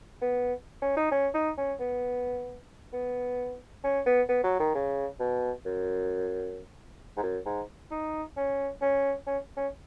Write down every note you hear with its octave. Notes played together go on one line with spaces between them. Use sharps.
B3
C#4
D#4
C#4
D#4
C#4
B3
B3
C#4
B3
B3
F#3
D#3
C#3
B2
F#2
G#2
F#2
G#2
D#4
C#4
C#4
C#4
C#4